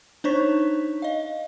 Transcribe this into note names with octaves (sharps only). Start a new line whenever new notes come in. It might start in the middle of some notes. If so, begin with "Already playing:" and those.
D4 D#4 C5 C#5 C#6 B6
D#5 F5